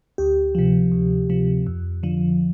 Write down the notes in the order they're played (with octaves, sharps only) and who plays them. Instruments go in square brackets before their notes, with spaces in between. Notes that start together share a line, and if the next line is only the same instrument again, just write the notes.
[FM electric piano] D2 G4
C3 F3
D2
C3 F3
F2
D3 F3